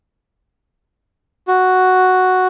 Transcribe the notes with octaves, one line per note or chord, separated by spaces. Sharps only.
F#4